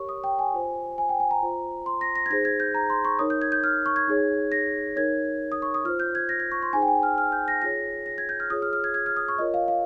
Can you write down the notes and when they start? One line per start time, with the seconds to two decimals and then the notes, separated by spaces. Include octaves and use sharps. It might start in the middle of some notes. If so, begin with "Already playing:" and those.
Already playing: G4 A#4 C#5 C#6
0.09 D#6
0.24 G5
0.39 G#5
0.54 F4 C5
0.98 G#5
1.09 G5
1.20 G#5
1.31 A#5
1.43 F4 C5
1.86 C6
2.01 A#6
2.16 A#6
2.26 G#6
2.30 D#4 G#4 C5 A#6
2.45 G#6
2.60 G6
2.74 A#5
2.90 C6
3.05 C#6
3.19 D#4 A#4 C#5 D#6
3.30 G6
3.42 G#6
3.52 G6
3.64 F6
3.86 C#6
3.96 G#6
4.08 D#4 G#4 C#5
4.52 A#6
4.96 D#4 A#4 C#5 G#6
5.52 D#6
5.62 C#6
5.74 D#6
5.85 F4 C5 F6
6.00 G6
6.15 G#6
6.29 A#6
6.40 G#6
6.52 C#6
6.63 C6
6.73 D#4 G#4 C5 G#5
6.82 G5
6.88 G#5
7.03 F6
7.18 F6
7.32 G6
7.48 A#6
7.62 F4 G#4 C#5 A#6
8.06 A#6
8.18 G#6
8.29 G6
8.40 F6
8.50 F4 G#4 C#5 D#6
8.62 F6
8.73 F6
8.84 G#6
8.94 G#6
9.06 F6
9.16 D#6
9.28 C#6
9.39 F4 A#4 C#5 D#5
9.54 F5
9.68 F5